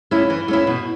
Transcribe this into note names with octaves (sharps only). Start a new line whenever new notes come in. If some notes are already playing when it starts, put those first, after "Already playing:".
A3 C#4 E4
E3
A3 C#4 E4
B2